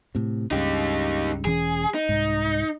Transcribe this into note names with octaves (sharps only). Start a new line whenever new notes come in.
A2 C3
C#2 G2 C#3 D#4 G4
E1 E3 C#4 G#4
D#4
C2 G#2